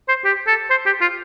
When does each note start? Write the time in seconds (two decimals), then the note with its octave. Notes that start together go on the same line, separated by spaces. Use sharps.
0.09 C5
0.25 G4
0.47 A4
0.70 C5
0.86 G4
1.01 F4